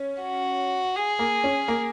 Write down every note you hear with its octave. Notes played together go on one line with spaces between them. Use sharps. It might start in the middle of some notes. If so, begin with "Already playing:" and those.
Already playing: C#4
F#4
G#4
A#3
C#4
A#3